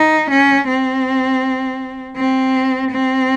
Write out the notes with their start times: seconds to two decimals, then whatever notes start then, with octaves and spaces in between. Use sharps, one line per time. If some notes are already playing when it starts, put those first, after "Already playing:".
Already playing: D#4
0.30 C#4
0.68 C4
2.16 C4
2.91 C4